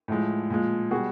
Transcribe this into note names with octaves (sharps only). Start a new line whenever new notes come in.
A2 F3 G#3
A#2 F3 G#3
B2 G3 F#4 G#4